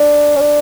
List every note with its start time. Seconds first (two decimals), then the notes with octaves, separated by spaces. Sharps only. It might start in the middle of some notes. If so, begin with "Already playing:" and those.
Already playing: D4
0.36 C#4
0.40 D4